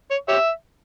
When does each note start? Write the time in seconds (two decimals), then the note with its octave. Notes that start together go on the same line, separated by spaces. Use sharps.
0.11 C#5
0.29 G4 C#5 E5